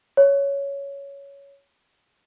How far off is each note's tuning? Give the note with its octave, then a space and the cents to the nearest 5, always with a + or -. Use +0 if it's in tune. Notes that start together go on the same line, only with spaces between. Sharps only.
C#5 +10